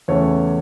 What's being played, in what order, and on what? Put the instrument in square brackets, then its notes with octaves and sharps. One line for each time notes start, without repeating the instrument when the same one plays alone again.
[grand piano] E2 C#3 E3 A3 C#5